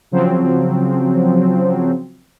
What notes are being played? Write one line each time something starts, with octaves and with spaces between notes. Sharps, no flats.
C#3 F3 F#3 C4